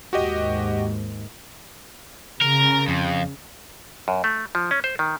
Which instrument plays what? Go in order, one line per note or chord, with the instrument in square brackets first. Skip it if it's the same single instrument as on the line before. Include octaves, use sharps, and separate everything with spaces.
[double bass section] D#2 G#2 [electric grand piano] F#4 G4 D#5
[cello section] C#3 [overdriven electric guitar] A#4
[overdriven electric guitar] F2
[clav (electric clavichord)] F#2
A3
F3
C#4
C5
D#3